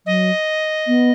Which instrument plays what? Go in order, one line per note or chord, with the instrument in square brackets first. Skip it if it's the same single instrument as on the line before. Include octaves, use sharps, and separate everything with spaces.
[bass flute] F#3 [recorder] D#5
[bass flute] B3